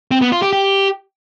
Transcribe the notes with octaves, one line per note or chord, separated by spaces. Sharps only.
C4
B3
F4
G4
G4